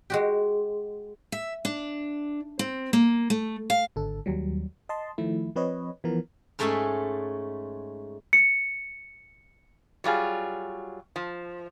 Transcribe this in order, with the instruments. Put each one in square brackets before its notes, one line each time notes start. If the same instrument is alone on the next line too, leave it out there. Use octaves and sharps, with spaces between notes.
[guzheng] G#3 F#4 G4
[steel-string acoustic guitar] E5
D4
C4
A#3
A3
F5
[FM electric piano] G#1 D3 A4
D#2 F#3 G3
D#5 A5 C6
D#3 F3 A3 E4
F3 C4 B4 C#5 D#5
E3 F3 B3 A#4
[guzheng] G#2 G#3 A3 C#4 E5 G#5
[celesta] C#7
[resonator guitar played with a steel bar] F#3 G3 F4 G#4
F3